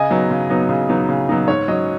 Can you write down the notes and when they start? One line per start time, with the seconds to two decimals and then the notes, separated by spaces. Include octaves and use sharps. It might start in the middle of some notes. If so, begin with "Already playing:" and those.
Already playing: C#3 D#5 G#5
0.11 F#3 B3 D#4
0.30 C#3
0.50 F#3 B3 D#4
0.69 C#3
0.89 F#3 B3 D#4
1.09 C#3
1.29 F#3 B3 D#4
1.48 G#2 C#5
1.68 F#3 C#4 D#5